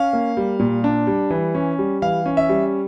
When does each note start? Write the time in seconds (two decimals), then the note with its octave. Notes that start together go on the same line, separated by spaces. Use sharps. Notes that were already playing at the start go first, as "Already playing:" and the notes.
Already playing: C#4 F5
0.13 A#3
0.37 G3
0.59 A#2
0.84 D4
1.07 G3
1.30 E3
1.55 C#4
1.79 G3
2.02 E3 F5
2.26 C#4
2.37 E5
2.49 G3